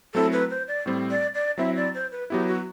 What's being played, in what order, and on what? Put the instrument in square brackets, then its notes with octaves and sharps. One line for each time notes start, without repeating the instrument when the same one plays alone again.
[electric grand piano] F#3 A3 C4 E4 [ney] A4
[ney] B4
C5
D5
[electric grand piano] A2 G3 C4
[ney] D5
D5
[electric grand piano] F#3 C4 E4 [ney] E5
[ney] D5
C5
B4
[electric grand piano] F#3 B3 E4 [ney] G4
[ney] F#4